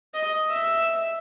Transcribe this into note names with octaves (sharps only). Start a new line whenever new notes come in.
D#5
E5